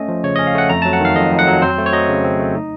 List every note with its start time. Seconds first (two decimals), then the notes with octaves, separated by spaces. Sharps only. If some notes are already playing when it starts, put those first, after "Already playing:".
Already playing: A3 C#4 D#5
0.08 F3
0.24 C#3 C#5
0.36 C#4 D#5
0.47 F5
0.55 A3 F#5
0.70 F2 A#5
0.82 F#3 A5
0.93 F#5
1.01 D#3 F5
1.16 F2 D#5
1.32 F2
1.39 F#5
1.47 F#3
1.62 C4 C5
1.78 A3
1.86 C#5
1.93 F#3 D#5
2.08 C#3
2.24 C4
2.39 A3
2.55 D#4